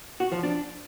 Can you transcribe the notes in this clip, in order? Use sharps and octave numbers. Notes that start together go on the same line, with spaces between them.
F#4
F3
D4